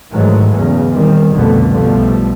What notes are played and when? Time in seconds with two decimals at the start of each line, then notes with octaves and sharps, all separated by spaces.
0.11 G#2 D#3 E3 F#3 G#3 A3
0.55 E2 C#3
0.92 A#2 D#3 G3 C4
1.34 C2 F2 B2 D3 A3 B3
1.70 B1 B2 F3 G3 A3